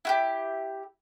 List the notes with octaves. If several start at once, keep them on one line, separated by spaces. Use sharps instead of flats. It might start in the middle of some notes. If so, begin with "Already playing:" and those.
E4 F#4 G4